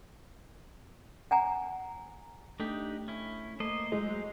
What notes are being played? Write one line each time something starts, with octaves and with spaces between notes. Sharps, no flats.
F#5 G#5 A#5
A3 D4 D#4 G4
C#4 E4
A3 A#3 C5 D#5
F#3 G#3 C5